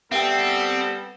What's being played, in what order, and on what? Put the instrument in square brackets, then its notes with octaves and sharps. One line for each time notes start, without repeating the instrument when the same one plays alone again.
[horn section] G3 B3 A4 [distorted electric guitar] C4 [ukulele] E5 G5